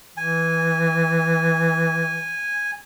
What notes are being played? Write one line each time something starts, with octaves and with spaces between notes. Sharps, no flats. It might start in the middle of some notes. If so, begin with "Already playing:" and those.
E3 G#5